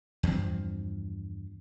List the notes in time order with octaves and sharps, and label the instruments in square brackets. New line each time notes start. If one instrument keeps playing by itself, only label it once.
[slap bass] E2 G2 F3 C4